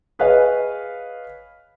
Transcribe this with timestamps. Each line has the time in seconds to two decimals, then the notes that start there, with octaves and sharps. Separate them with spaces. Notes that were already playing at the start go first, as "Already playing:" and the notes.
0.19 G#4 B4 C#5 D#5 F5 G#5